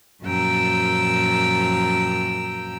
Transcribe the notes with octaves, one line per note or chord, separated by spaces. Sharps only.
F#2 A#2 F3 G5 A#5 E6